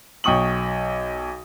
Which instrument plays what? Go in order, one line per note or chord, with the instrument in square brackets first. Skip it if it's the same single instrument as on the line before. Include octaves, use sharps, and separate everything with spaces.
[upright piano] B1 G5 C#6 D#6 F#7